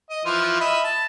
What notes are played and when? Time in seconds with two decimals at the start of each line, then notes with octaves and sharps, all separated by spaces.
0.10 D#5
0.25 E3 F3 F4
0.60 D#5 E5 B5
0.84 A5